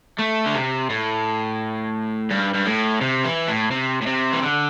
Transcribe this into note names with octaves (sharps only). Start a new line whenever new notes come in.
A3
D3
C3
A2
G2
G2
A2
C3
E3
A2
C3
A2
C3
E3
D3